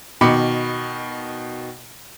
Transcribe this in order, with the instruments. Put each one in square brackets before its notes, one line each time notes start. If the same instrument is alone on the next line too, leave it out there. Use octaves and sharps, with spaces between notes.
[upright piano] B2 D#3 B5 D6 C#7